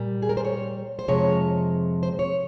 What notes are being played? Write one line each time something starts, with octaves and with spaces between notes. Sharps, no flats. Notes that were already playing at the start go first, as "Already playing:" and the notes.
Already playing: A#2 G3
G#4
A#4
C5
C#5
C5
F2 C3 F3 G#3 C#5
C5
C#5